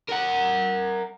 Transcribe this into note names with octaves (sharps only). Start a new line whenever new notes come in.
A#4 F#5